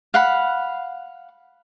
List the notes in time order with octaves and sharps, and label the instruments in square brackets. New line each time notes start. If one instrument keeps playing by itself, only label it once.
[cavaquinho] F5 F#5 B5